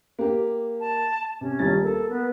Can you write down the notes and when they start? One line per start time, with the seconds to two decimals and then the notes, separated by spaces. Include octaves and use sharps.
0.19 A#3 G4
0.80 A5
1.41 C3 C#4
1.59 D#1 A6
1.83 A#3 A4
2.09 B3